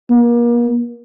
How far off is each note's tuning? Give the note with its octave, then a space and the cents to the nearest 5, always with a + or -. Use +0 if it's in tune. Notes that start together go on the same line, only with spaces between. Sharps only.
A#3 +35